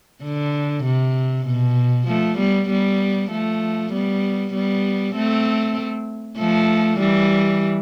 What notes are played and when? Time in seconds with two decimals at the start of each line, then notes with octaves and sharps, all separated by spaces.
0.23 D3
0.84 C3
1.47 B2
2.08 F3 A3
2.38 G3 B3
2.69 G3 B3
3.31 F3 A3
3.92 G3 B3
4.53 G3 B3
5.16 A3 C4
6.38 F3 A3
7.00 E3 G3